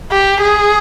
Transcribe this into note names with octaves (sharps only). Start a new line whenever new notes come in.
G4
G#4